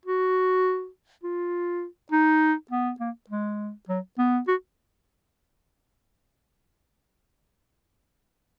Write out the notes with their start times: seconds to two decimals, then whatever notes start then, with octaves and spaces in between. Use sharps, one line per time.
0.05 F#4
1.24 F4
2.12 D#4
2.71 B3
3.00 A#3
3.29 G#3
3.89 F#3
4.18 B3
4.48 F#4